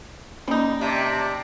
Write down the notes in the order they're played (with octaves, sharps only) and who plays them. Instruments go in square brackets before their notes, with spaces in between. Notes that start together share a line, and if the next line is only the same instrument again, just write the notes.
[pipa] G3 D#4 [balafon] A#3 C#4
[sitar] C3 [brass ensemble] G4 D5 A5